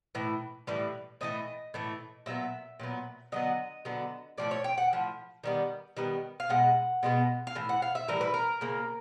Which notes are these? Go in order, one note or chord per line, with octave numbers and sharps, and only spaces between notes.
A2 E3
A2 E3 G3
A2 E3 A3 D#5
A2 E3 A3
A#2 F#3 B3 E5
A#2 F#3 B3
D3 F#3 B3 D#5
D3 F#3 B3
A2 F3 A3 D5
C#5
G5
F#5
A2 F3
D#3 G3 B3
D#3 G3 B3
F5
B2 G#3 F#5
B2 G#3 B3
F5
A2 E3
F#5
F5
E5
A2 E3 G3 A#4
B4
A#4
C#3 F3 A#3